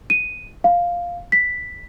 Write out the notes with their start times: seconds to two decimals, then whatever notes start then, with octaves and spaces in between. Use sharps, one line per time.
0.10 D#7
0.64 F5
1.32 B6